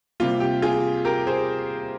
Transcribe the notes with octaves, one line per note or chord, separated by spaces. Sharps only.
C3 G3 A#3 F4
G4
F4 G#4
G4 A#4
G#4 C5